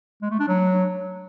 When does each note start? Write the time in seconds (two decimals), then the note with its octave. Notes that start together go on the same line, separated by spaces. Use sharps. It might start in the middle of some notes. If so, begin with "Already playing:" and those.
0.22 G#3
0.31 A3
0.39 D4
0.48 F#3